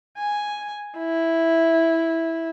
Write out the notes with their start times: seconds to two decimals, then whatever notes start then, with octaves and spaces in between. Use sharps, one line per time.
0.18 G#5
0.98 E4